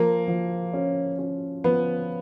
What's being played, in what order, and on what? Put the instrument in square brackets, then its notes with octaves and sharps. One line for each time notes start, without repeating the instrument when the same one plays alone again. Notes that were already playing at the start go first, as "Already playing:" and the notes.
Already playing: [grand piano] F3 [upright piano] A#3
[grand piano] F3
C#4
C#4
[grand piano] F3 [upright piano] B3